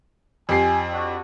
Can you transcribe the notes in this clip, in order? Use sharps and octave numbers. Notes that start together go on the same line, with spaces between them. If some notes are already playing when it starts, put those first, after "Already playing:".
F2 G4 G#5 C7
D4 F#4